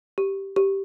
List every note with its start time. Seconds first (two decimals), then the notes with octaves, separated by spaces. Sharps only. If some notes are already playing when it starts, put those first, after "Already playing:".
0.18 G4
0.56 G4